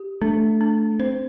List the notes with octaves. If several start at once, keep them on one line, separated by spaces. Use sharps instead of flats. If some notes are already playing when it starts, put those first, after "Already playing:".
Already playing: G4
A3 D4
D4
C4 C5